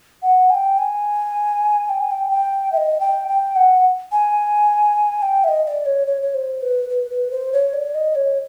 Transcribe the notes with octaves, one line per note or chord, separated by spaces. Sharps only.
F#5
G#5
G5
G#5
G5
G#5
G5
G5
E5
D#5
G5
G5
F#5
G#5
G5
E5
D#5
D#5
D5
C#5
C#5
C#5
C5
B4
B4
B4
C5
C#5
D5
D#5
C#5